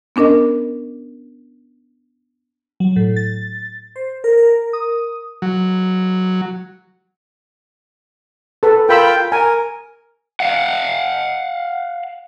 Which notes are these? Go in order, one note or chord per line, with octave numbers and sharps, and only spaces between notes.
B3 C#4 D4 A#4 D#5
F#3
A2
A6
C5
A#4
A#4
D#6
F#3
A4 B4
F4 A#4 G5 B5 E6
A#4 G#5
F5 F#5